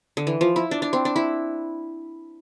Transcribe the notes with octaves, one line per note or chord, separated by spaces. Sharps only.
D3
E3
F3
E4
D4
D4
C4
D4
E4